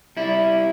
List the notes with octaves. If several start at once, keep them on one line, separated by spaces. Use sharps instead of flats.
G3 E4